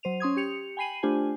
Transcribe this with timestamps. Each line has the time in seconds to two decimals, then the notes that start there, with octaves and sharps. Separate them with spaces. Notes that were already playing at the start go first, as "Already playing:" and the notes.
0.03 F#3 C5 D#7 F7
0.20 C#4 C6 D#6 G#6
0.37 G4 C#7 F7
0.77 G5 G#5 B5 C7 D#7 F#7
1.03 A3 D4 F4 G4 C5 G#5